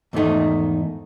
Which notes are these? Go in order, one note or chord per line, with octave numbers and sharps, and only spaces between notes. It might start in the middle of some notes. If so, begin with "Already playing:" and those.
E2 G#2 D#3 A3 D#4